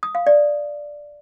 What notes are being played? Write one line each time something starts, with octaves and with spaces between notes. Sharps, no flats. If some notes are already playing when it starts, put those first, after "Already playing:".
D#6
F5
D5